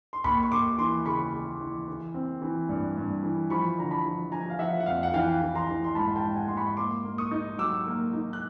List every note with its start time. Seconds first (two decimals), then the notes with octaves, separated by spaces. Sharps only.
0.13 C6
0.24 D#2 B5 C#6
0.43 C#6
0.51 D#2 C6 D6
0.78 E3 C6 D6
1.06 C#3 B5 C#6
1.34 C#3
1.61 E3
1.88 E3
2.14 C4
2.42 E3
2.69 G2
2.97 G2
3.24 E3
3.50 F3 B5 C#6
3.78 D3 A#5
3.91 A5 B5
4.05 F3
4.32 F3 G#5 A#5
4.50 F5
4.59 F3 E5 F#5
4.80 F#5
4.86 F2 F5
5.03 F#5
5.14 E3 F5 G5
5.42 E3
5.55 A#5 C6
5.69 E3
5.84 C6
5.95 G#2 A5 B5
6.16 G5 A5
6.23 G#2
6.36 F#5 G#5
6.48 G#2 C6
6.57 B5 C#6
6.77 A#3 C6 D6
7.05 A#3
7.18 C#6 D#6
7.31 D#4
7.58 F#3 D6 E6
7.87 A#3
8.13 D#4
8.33 F#6